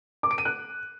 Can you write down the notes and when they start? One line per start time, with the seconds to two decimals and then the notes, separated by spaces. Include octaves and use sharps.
0.23 D6
0.31 D7
0.38 D#7
0.45 F#6